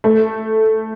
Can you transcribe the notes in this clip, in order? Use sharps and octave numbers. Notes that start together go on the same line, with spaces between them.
A3